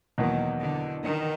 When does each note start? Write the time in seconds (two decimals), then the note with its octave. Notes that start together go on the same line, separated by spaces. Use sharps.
0.18 E2 B2 D#3 F#3 A#3
0.60 D3
1.04 D#3